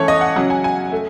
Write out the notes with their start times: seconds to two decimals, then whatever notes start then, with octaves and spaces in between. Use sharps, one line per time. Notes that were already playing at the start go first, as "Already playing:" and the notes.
Already playing: E3 A3 C#4 A4 C#5
0.08 D#5
0.21 F#5
0.36 C#3 F#3 C#4 F#5
0.50 G#5
0.64 G#5
0.92 A3